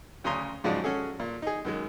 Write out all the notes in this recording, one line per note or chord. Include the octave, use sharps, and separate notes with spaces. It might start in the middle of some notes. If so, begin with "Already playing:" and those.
D2 C#3 C#4 A#5 C6 D#6
G#2 C#3 F3 F#3 G#3 D5
C#4 F#4 G#4 A4
A#2
D#4 G#4
F#2 D#3 G#3